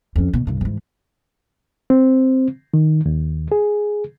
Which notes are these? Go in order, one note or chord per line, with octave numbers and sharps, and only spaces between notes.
F2 C#4
B2
C2 G2
G#2 E3
C4
D#3
D#2
G#4